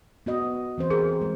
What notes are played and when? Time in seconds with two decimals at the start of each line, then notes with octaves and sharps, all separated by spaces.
0.26 B3 F#4 D#5
0.78 E3 C4 C5
0.90 G4 G#4 A#4
1.21 G#3